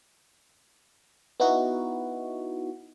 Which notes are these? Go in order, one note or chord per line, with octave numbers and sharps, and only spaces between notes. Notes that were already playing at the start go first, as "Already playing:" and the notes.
B3 D#4 E4 F#4